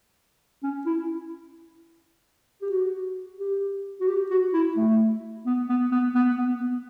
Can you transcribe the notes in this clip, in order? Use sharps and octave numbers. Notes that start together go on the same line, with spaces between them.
C#4
E4
G4
F#4
G4
F#4
G4
F#4
E4
A3
B3
B3
B3
B3
B3
B3